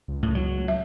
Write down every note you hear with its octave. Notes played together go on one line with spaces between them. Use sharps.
C#2
A2
F#3
E5